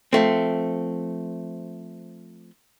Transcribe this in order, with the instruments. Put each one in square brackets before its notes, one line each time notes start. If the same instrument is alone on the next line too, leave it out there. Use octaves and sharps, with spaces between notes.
[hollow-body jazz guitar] F3 A3 C4